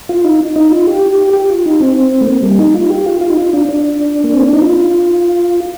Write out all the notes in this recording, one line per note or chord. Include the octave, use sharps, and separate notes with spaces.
F4
D#4
D#4
F4
G4
G4
F4
D#4
C4
A3
A#3
G3
D#4
F4
G4
F4
F4
D#4
F4
D4
D4
A#3
C4
D4
D#4
F4